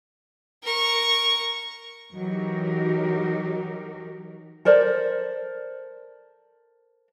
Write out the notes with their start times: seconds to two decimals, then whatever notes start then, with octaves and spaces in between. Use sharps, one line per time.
0.63 A#4 C#6
2.13 E3 F#3 D#4 F#4 G4 A#4
4.65 A4 A#4 C5 D5